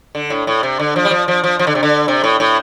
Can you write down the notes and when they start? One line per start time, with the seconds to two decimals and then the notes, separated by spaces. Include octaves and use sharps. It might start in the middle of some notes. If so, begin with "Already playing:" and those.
0.15 D3
0.30 A2
0.47 A2
0.63 C3
0.79 D3
0.96 F3
1.05 G3
1.11 F3
1.28 F3
1.44 F3
1.59 F3
1.67 D3
1.75 C3
1.83 D3
2.08 C3
2.24 A2
2.40 A2